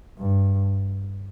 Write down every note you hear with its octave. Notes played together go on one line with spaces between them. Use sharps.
G2